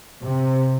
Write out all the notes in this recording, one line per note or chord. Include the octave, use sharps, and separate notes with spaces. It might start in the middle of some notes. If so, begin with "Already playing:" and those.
C3